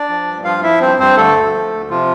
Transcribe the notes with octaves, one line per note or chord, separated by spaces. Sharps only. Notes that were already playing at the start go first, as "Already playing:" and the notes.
Already playing: D4 D5
F3
G2
F3 F4 F5
F3 E4 E5
G2 C4 C5
G2 C4 C5
D3 A3 A4
D2
F3
D2
C3 F3 F4